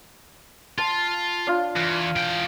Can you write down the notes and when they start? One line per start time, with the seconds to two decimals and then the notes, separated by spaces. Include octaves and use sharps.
0.79 F4 A5
1.47 D4 F4
1.76 E2
2.16 E3 G5